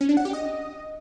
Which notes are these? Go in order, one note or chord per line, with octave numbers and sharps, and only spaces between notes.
C#4
D4
F#5
G4
D#5